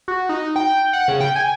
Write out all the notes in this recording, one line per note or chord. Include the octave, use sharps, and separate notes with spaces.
F#4
D#4
G5
F#5
C#3
G5
G#5